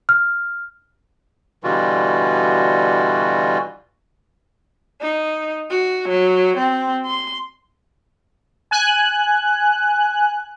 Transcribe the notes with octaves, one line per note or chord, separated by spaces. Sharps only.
F6
B2 D3 E3 G3 F4 F#4
D#4
F#4
F#3
C4
C6
G#5 F#6